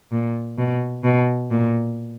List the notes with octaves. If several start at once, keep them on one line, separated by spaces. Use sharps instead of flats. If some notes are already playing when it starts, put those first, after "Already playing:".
A#2
B2
B2
A#2